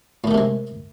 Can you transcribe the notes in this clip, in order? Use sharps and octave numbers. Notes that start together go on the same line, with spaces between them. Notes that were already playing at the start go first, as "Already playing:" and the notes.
A2 C3 D#3 G#3 A3